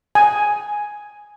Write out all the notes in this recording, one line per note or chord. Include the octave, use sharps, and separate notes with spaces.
G#5